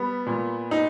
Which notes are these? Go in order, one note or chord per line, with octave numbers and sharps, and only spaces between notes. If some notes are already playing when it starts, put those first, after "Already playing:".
Already playing: G3 B3
A#2
D#4